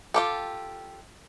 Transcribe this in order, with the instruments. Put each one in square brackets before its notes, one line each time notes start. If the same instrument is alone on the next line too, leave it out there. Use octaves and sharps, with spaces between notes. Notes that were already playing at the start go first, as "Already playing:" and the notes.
[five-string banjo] F4 G4 A4